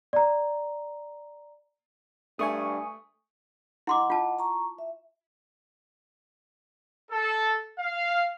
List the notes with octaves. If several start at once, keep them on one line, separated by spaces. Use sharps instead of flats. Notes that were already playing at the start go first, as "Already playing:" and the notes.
D5 A#5
G2 A3 G#5 C#6 D#6
E4 D#5 F#5 C6 D6
F4 A5
A#5 C#6
E5
A4
F5